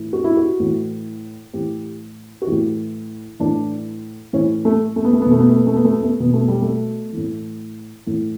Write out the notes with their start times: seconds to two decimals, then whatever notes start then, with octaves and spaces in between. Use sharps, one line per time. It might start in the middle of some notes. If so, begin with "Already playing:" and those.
Already playing: A2 E3
0.13 F#4
0.24 E4
0.37 F#4
0.60 A2 E3
1.53 A2 E3 G4
2.42 F#4
2.47 A2 E3 G4
3.40 A2 E3 D4
4.33 A2 E3 C#4
4.65 A3
4.96 A3
5.05 B3
5.13 A3
5.22 B3
5.26 B2 A3
5.40 B3
5.49 A3
5.59 B3
5.67 A3
5.76 B3
5.85 A3
5.93 B3
6.03 A3
6.20 B2 B3
6.34 A3
6.48 G3
6.62 A3
7.13 A2 E3
8.06 A2 E3